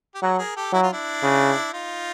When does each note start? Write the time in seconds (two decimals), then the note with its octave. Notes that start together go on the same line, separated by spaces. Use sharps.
0.15 G4
0.22 F#3 F#4 G#4
0.33 A4
0.39 G#4 A#4
0.55 G4 A4
0.73 F#3 E4
0.83 F4
0.93 D4 E4
1.23 C#3
1.73 D#4 F4